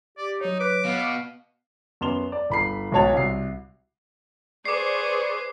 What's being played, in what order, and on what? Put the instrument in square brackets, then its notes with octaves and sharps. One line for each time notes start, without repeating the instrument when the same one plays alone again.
[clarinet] G4 [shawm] D5
[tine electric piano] F#3 C#5 [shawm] D#4
[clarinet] B4 [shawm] D6
[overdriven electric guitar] B2 B3 [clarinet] F5
[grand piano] F#2 B3 C6 E7 F7 G7
D5
G1 B5 C7
B1 G#2 F#4 C#5 A5 F7
C2 F#4 C7
[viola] G#4 [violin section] B4 C5 [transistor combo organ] D5 C#6 [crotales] D6 C7